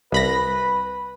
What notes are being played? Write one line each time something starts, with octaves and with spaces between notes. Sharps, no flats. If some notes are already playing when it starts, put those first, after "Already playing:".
C2 B4 B5 A#6